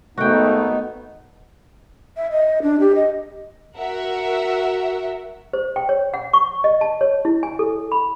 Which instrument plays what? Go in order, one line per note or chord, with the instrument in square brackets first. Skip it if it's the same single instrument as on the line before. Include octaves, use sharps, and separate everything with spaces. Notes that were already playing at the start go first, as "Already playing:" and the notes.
[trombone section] G#1 A3 [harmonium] B3 D#4 [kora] F#4 G5
[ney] E5
D#5
D4
G4
D#5
[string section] F#4 A#4 E5 F#5
[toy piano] C5
G5
C#5
F#5
C#6
D#5
A5
C#5
E4
G#5
A4
B5